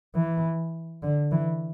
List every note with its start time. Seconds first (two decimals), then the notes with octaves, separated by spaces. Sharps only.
0.16 E3
1.03 D3
1.32 E3